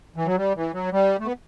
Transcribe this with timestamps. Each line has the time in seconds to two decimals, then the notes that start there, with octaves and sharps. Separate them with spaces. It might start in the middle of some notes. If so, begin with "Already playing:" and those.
0.16 E3
0.26 F#3
0.37 G3
0.55 E3
0.73 F#3
0.92 G3
1.20 A3
1.26 B3